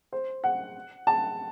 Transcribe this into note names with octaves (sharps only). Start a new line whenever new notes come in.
C5
F#5
A5